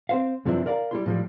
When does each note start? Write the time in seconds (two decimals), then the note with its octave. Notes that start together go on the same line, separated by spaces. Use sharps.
0.09 C4 C5 F5
0.45 F#2 C3 E3 F3 D4 E5
0.66 A#4 D5 F5 A#5
0.91 G3 E4 C6
1.06 A2 F3 G3